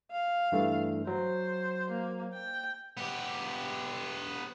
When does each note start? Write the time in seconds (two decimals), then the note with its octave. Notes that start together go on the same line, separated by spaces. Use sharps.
0.11 F5
0.52 G2 E3 A3
1.07 F#3 C5
1.91 A#3
2.33 G5
2.97 B3 G4